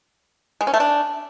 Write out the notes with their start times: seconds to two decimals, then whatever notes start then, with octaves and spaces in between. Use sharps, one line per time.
0.61 G#3
0.67 C#4
0.74 A3
0.80 D4